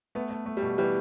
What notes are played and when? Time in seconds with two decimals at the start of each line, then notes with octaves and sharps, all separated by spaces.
0.15 A3 B3
0.31 A3
0.46 A3
0.57 G3
0.62 B2
0.78 E3 G3